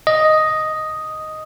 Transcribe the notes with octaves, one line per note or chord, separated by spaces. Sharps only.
D#5